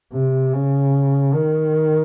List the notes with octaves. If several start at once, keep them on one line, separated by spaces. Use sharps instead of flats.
C3
C#3
D#3